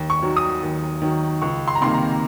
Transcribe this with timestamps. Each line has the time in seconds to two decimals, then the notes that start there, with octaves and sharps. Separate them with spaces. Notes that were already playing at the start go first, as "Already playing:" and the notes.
Already playing: D#2
0.10 C#6
0.22 D#3 F#3
0.36 D#6
0.63 D#2
1.02 D#3 F#3
1.42 C#2 C#6
1.68 C6
1.75 A#5
1.81 C3 D#3 A#3 C6
1.94 A#5